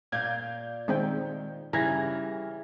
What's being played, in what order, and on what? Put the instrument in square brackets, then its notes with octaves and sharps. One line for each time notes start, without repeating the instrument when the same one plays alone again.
[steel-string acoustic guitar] A#2 D5 F5 [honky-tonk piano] G6 G#6
[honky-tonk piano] D#3 [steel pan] G#3 C4 G5
[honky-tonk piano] C#3 G#6 A#6 [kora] E3 [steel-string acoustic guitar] G3 [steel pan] A#5